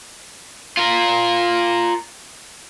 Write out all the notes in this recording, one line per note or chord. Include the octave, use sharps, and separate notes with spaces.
F4 A#4